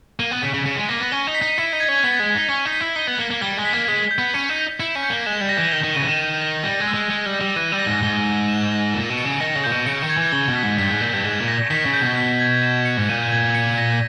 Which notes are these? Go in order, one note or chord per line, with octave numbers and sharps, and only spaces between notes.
A#3 D#7
B3
C#3 B6
C#3
C#3 C#7
G#3
A#3 A#6
B3
C#4 G7
D#4
B6
D#4
E4 C#7
D#4
G#6
C#4
B3 B6
G#3
G#6
D#4
C#4 G7
D#4
B6
E4
D#4 G7
B3
A#3 C#7
A#3
G3 G7
G#3
B6
A#3
G#3 B6
G6
B3
C#4 C#7
D#4
G6
E4 C#7
C#4
G6
A#3
G#3 E7
G3
A#6
E3
D#3 G7
D#3
C#3 D#7
E3
D#3
D#7
A#6
G3 A#6
G#3
E6
G#3
G#3 C#7
G3
A#6
G3
E3 D#7
G3
A#6
G#2
G#2 G7
D#7
E7
A#6
A#2 E7
B2
C#7
C#3
D#3 A#6
C#3
A#2 G6
B2
C#3 C#7
D#3
G#6
E3
C#3 G7
B2
B6
G#2
G2 B6
G#2
A#2 G6
G2
G#2 E7
A#2
A#6
D#3 B6
C#3
G6
B2
B6
G#6
E7
C#7
G#2
A#2 D#7
G#6
C#7
A#6